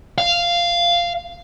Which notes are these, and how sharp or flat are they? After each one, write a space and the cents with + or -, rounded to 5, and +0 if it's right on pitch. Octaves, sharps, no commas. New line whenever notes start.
F5 -10